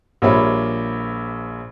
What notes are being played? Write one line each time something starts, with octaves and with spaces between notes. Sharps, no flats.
A#1 G3 A#3 C#5 E5 B5